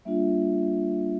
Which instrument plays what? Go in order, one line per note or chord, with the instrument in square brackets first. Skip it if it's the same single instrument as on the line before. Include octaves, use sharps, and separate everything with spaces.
[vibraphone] G3 A#3 D4 F4 E5